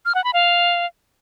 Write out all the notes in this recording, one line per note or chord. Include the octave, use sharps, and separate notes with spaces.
F6
F#5
B5
F5